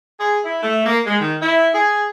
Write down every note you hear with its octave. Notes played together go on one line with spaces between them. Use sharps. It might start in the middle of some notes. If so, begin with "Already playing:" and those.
G#4
E4
A3
A#3
G#3
D#3
E4
G#4